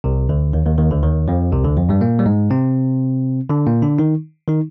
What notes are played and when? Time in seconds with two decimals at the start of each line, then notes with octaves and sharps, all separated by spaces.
0.04 C2 C3
0.29 D2 D3
0.53 D#2 D#3
0.66 D#2 D#3
0.78 D#2 D#3
0.91 D2 D3
1.03 D#2 D#3
1.28 F2 F3
1.52 C2 C3
1.65 D2 D3
1.77 F2 F3
1.89 G2 G3
2.01 A#2 A#3
2.19 G3
2.26 G#2 G#3
2.51 C3 C4
3.50 D3 D4
3.66 A#2 A#3
3.82 D3 D4
3.99 D#3 D#4
4.48 D#3 D#4